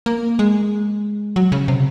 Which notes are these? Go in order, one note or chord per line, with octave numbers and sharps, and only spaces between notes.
A#3
G#3
F#3
C#3
C3